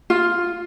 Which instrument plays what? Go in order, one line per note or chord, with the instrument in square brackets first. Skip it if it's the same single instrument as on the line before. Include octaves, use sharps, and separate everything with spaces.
[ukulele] F4